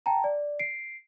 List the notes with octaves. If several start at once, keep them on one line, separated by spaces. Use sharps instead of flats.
G5 A5 A#5
D5
C7 D7